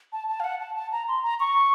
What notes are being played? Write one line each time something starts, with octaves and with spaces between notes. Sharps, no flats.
A5
A5
F5
F#5
A5
A5
A#5
C6
A#5
C#6